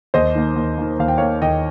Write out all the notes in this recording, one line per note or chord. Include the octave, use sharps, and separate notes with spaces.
D#2 C5 D#5
D#3 A#3
D#2
D#3 A#3
D#2 F5
G5
D#3 A#3 C#5 F5
D#2 D#5 G5